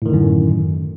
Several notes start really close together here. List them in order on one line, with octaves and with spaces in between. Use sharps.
A2 D#3 D3 F#2